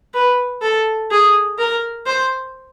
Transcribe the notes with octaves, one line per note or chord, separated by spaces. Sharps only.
B4
A4
G#4
A#4
C5